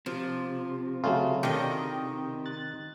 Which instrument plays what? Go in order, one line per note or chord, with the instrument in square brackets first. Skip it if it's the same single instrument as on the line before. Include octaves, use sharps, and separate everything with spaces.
[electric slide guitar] C3 [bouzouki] F3
[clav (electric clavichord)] C#3 [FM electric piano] F#3 A3 F4
[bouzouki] D#3 D#5 [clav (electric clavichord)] D4 F4 G4 [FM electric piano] G5
[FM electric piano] F#6 A6